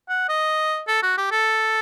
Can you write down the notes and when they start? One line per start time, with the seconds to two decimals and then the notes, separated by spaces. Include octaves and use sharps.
0.09 F#5
0.29 D#5
0.88 A4
1.03 F#4
1.17 G4
1.31 A4